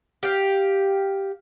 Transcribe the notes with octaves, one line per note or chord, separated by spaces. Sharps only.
G4 F5